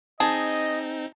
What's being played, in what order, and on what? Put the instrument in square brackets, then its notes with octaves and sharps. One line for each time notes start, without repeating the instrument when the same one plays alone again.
[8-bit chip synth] C4 D#4 [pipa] G#4 [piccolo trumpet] D#5 [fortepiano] A5